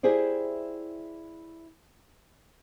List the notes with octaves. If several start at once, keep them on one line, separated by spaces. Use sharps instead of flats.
E4 G4 G#4 C5 D5